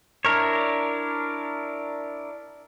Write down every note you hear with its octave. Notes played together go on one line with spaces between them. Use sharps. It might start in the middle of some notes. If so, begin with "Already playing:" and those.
D4 E4 A#4 C#5